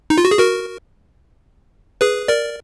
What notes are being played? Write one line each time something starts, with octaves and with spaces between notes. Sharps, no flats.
D#4
F4
F#4
G#4
F#4 A#4
G#4 B4
A#4 D5